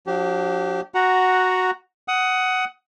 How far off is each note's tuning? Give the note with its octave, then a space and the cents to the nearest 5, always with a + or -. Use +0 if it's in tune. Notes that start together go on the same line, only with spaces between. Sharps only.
F3 +45 D4 +0 G4 -25
F#4 +0 F#5 +0 A#5 +0
F#5 +10 D#6 +15